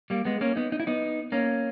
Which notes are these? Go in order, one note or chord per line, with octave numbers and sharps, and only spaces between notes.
G3 A#3
G#3 B3
A#3 C#4
B3 D#4
D#4
E4
B3 D#4
A#3 C#4